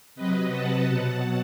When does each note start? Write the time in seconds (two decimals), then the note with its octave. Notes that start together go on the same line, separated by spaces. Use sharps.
0.15 C3 F#3 B4 D#5
0.52 F#5 A5
0.88 B2 F#3